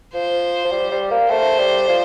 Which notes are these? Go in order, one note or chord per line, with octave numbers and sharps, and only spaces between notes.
F3 C5
F3
G3
G3
A#3
A3 C5
G3
F3